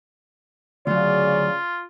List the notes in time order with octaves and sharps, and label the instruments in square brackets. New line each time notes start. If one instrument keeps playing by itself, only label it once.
[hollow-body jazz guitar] D2 F#3 [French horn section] C#3 D5 [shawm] F4